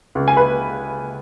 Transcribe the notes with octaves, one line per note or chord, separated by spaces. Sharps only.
C#2
G#5
B4 B5